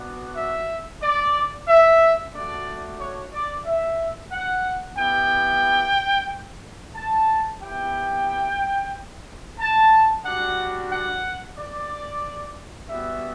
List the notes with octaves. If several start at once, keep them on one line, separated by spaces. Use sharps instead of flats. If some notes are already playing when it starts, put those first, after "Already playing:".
Already playing: B3 D4 F#4
E5
D5
E5
A3 D4 F#4 D5
C#5
D5
E5
F#5
B3 E4 G4 G5
A5
B3 E4 G4 G5
A5
G3 D4 F#4 F#5
F#5
D5
G3 B3 F#4 E5